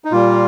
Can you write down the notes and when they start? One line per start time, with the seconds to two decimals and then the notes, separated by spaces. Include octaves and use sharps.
0.05 D#4
0.12 A#2 G3 A#3 F4